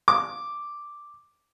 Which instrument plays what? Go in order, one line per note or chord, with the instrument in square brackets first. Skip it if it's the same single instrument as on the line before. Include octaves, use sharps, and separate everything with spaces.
[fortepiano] D6